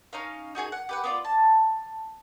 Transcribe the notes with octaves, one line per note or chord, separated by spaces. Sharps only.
C#4 D#4 F5
D#4 F#4 G#4 G#5
F#5
G4 B4 F#5
B3 F4 D5
A5